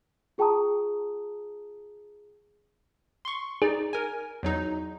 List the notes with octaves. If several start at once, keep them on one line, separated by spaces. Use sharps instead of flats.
F4 G#4 G5 A5 A#5 D#6
C6 C#6
D#4 G#4 D5
A#4 G#5
E2 F#3 D#4